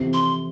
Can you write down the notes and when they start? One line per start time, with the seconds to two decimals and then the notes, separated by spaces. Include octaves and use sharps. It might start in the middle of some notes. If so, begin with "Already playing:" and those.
Already playing: F2 C3 E3
0.13 C6